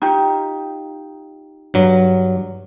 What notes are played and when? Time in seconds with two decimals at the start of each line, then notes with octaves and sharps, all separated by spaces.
0.02 D#4 F4 G4
1.74 G2 F#3